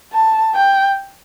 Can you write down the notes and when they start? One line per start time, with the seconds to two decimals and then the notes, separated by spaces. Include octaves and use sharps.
0.13 A5
0.55 G5